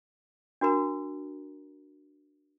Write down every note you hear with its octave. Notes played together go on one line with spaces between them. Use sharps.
D4 F#4 A#4 A#5